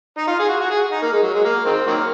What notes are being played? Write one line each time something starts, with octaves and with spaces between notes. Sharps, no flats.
D#4
F4
G#4
F#4
F#4
G#4
D#4
A#3
G#3
F#3
G#3
A#3
D#3 G#3 C4
D#3 F#3 A#3